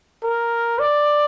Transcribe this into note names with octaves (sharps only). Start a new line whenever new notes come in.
A#4
D5